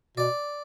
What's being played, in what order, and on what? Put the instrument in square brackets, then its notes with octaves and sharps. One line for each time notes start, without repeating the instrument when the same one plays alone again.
[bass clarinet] B2 [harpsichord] D5